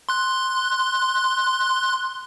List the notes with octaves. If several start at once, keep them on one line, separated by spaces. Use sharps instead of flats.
C6 F#6